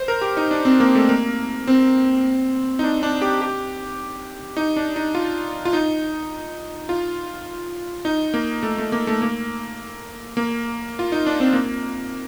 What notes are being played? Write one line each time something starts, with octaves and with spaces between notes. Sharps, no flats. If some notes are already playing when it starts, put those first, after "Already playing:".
Already playing: C5
A#4
G4
D#4
D4
C4
A#3
A3
A#3
C4
D#4
D4
D4
G4
G4
D#4
D4
D#4
F4
F4
D#4
F4
D#4
A#3
A3
A3
A#3
A3
A#3
A#3
F4
D#4
D4
C4
A#3